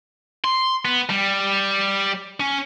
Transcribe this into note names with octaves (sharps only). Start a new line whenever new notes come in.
C6
B3
G3
C#4